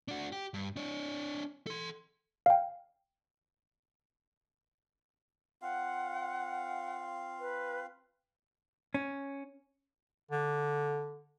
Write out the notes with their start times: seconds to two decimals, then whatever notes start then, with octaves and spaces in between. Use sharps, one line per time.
0.08 D4 F#4
0.32 G4
0.54 G2
0.76 D4 C#5
1.67 A4 C6
2.46 F5 G5
5.62 C4 F4 F5 F#5
7.40 B4
8.94 C#4
10.31 D3